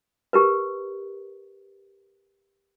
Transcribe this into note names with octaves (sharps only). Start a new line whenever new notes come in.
G4 A#4 B4